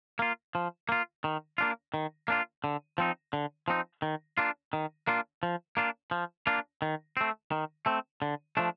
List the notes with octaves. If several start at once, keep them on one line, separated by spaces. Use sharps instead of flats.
A#3 F4
F3
A#3 F4
D#3
A#3 D4 F4
D#3
A#3 D4 F4
D3
F3 C4 D#4
D3
F3 C4 D#4
D#3
A#3 D4 F4
D#3
A#3 D4 F4
F3
A#3 D4 F4
F3
A#3 D4 F4
D#3
A3 C4
D#3
A3 C4
D3
F3 A3 D4